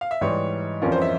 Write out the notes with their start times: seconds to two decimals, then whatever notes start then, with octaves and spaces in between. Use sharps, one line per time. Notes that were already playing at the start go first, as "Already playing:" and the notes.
0.01 F5
0.11 E5
0.21 G#2 E3 G3 C#5
0.82 F2 E3 G3 C#4 F4 A#4
0.92 C5
1.02 E5